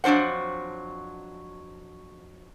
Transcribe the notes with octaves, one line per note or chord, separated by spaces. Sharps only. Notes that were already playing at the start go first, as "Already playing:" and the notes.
F2 F#3 D4 C5 F#5